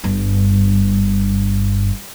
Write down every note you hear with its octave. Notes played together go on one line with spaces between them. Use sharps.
G1 G2